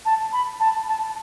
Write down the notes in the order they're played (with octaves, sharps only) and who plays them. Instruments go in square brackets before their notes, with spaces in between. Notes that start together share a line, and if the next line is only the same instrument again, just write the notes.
[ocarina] A5
B5
A5
A5